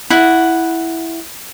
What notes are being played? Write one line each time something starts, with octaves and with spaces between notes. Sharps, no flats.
E4 F#5